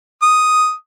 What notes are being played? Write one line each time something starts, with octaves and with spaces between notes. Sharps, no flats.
D#6